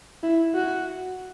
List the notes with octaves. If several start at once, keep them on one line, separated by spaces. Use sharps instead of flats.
E4
F#4